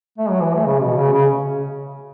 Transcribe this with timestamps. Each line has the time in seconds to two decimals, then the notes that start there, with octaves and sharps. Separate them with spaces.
0.18 A3
0.30 F#3
0.42 E3
0.54 A3
0.66 C#3
0.81 B2
0.97 C#3
1.12 C#3